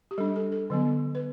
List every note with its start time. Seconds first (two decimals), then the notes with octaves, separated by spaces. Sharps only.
0.11 G4
0.18 G3 D4 A4
0.36 A4
0.52 A4
0.70 D3 F#3 B3
1.15 B4